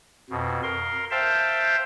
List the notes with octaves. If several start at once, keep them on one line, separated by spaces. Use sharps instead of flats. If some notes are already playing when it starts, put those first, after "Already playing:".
F2 B2
A#4 C6
C5 E5 F5 G5 A5